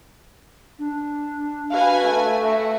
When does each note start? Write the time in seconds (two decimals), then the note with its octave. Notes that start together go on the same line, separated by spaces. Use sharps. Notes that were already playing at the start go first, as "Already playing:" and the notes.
0.79 D4
1.71 F#4 B4 F5 G#5
2.04 A3
2.43 F#4 E5